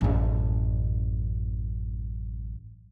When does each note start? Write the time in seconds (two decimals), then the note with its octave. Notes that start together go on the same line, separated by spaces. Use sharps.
0.01 A1 F#2